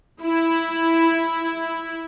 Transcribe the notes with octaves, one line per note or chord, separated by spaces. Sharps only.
E4